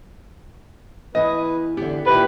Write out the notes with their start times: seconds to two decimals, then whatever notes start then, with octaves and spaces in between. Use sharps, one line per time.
1.15 E2 E3 B4 D#5
1.77 E2 D3 B3 G4
2.06 A#2 D#3 E4 G4 B4